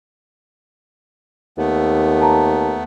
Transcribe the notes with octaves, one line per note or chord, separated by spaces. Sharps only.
D#2 A3 B3
A5 A#5